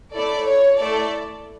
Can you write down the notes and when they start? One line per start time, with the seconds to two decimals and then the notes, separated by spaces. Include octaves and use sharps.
0.13 A3 E4 A4 D5
0.45 C#5
0.77 A3 E4 A4 D5